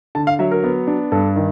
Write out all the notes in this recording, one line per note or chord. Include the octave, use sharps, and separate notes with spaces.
D3 A5
F5
F#3 E5
A#4
B3
D4
G2 A4
D#3